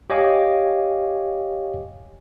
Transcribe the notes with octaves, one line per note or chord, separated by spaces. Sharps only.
G4 C#5 D#5 F5 G#5 D6